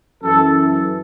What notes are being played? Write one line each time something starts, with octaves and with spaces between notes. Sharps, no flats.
F#2 E3 A4